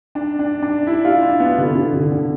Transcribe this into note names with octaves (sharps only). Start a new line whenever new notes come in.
D4
D4
D4
E4
F4
D4
B3
D3
D3
D3
D3